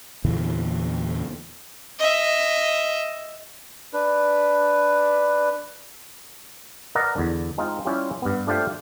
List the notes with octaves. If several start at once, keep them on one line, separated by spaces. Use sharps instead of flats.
E2 A#2 D3 E3
D#5 E5
D4 B4
A#4 B4 D5 D#5 F5 F#5
E2 D3
G#3 C4 D#4 F4
G3 C#4 E4 F4 G4
G2 B3
A3 D4 F4 G4 C5 F5